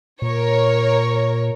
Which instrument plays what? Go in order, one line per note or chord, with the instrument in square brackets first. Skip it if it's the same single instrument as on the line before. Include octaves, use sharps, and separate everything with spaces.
[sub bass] A#2 [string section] A#4 C#5